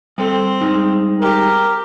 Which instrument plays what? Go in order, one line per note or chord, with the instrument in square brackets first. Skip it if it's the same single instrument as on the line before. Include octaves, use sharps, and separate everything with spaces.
[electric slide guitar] G3 A4 [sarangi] C4
[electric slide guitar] G3 G#3 D#4
[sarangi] G4 [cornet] A#4